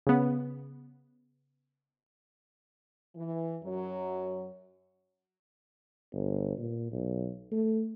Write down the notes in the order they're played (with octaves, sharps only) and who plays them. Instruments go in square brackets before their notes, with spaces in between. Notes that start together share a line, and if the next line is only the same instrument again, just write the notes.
[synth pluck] C#3 B3
[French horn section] E3
F#2 F#3
[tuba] G1
A#2
B1
A3